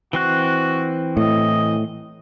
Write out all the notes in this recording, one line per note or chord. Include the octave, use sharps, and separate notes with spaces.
E3 C4 F#4 F#6
A2 D#5